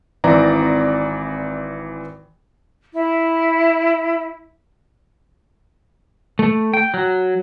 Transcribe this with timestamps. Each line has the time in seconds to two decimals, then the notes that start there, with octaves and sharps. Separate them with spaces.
0.24 G#1 E3 C4 D5 A#5
2.94 E4
6.39 A3
6.74 G5
6.94 F#3